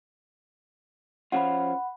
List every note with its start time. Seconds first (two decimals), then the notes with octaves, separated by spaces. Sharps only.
1.32 F3 C#4 F4 F#5 B5